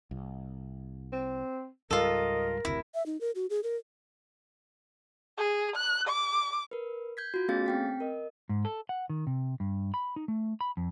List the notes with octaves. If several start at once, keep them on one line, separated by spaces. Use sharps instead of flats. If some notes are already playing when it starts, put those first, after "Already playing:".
C2
C4
C#2 G#2 G3 F4 A4 A#4 D#5
F#1 D2 C3 E4
E5
D#4
A#4
F#4
G#4
A#4
G#4
F#6
D6
A#4 B4
G6 G#6 B6
F4 F#4
A3 B3 C#4 G#4 F5 A6
C4 G5 B6
A#4 D#5
G#2
A4
F#5
D#3
C3
G2
B5
D#4
A3
B5
F2